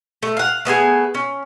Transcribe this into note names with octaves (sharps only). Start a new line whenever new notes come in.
A3
F5 F#5
A3 B3 F4 G#4
C#4